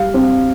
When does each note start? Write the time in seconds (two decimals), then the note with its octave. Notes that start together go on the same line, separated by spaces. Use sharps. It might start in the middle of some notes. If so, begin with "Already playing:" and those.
Already playing: G3 F5
0.14 C4